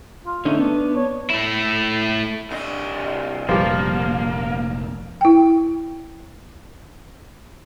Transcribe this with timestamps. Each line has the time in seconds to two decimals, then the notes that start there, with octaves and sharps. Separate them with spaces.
0.25 F4
0.45 D3 A3 C#4 D#4
0.59 B3 D4
0.96 C#5
1.30 A3 E4
2.51 C2 D4 D#5
3.49 F1 A#1 B2 F3 G3 A#3
5.21 E4 G5